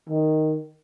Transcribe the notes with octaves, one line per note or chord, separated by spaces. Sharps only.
D#3